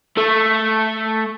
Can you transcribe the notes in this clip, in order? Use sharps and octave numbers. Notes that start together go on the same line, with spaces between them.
A3